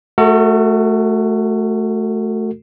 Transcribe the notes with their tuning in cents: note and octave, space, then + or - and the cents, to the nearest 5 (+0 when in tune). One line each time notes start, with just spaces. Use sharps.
A3 -15 F#4 +0 A4 +45